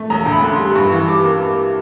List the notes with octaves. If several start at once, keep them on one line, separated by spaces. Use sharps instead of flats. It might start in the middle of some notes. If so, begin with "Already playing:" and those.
Already playing: A3
E1 A#5
D2
B5
D3
C6
G3
G2 C#6
E3
G3 D6
A#3